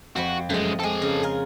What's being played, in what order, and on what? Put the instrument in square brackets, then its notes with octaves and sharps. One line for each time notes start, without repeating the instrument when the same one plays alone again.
[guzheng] F2 C4 B5 [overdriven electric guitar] F#4
[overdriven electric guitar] F#2 G#3 [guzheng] A3 D#5
[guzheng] G#3 C4 [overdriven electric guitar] A4 G#5
[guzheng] C#3
F4 G#4 A#4